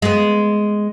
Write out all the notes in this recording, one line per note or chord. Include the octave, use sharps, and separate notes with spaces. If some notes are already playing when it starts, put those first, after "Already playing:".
G#3 B3